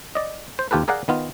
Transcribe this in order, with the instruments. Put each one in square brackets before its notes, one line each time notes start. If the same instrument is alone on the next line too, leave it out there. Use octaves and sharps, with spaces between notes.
[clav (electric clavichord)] D5 D#5
C5
D#2 F4 G4 A4 B4
G#4 A#4 D5 F5 F#5
D#3 B3 F4